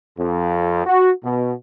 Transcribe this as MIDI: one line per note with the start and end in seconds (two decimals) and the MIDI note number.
0.18 0.84 41
0.86 1.10 66
1.24 1.54 47